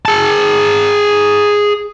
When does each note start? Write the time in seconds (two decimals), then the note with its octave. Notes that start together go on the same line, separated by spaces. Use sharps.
0.05 G#4 A5